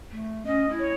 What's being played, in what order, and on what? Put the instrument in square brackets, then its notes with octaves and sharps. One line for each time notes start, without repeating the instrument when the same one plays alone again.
[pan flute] A3
[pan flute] C#4 [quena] D#5
[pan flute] E4
[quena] C#5